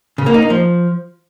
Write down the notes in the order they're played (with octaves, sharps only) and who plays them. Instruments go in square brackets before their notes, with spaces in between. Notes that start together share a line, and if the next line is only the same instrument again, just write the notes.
[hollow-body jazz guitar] C#3
A#3
D#4
A#3
F3